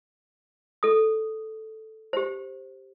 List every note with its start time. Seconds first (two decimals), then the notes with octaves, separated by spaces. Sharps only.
0.83 A4 D#6
2.13 G4 C5